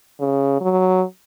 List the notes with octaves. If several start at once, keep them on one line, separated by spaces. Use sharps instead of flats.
C#3
F#3